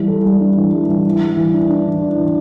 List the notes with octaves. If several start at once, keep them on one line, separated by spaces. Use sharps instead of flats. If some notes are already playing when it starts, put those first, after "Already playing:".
Already playing: E3 G3
A4
G3
D4
E3
G3
E3
E3
G3
E3
D4
D4
E3
D4
E3